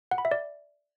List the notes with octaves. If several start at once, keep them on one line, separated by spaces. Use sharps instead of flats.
F#5
B5
E5
D5